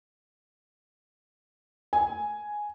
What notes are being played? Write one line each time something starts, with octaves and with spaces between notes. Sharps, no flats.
G#5